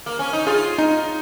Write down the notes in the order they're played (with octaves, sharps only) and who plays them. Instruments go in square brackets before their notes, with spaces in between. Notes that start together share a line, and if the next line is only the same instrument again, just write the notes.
[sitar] A#3
C#4
D#4
[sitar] F4 [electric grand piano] G#4
[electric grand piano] D#4